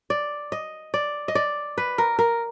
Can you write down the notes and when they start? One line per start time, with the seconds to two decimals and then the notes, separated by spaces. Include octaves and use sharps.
0.10 D5
0.52 D#5
0.94 D5
1.28 D#5
1.35 D5
1.78 B4
1.98 A#4
2.19 A#4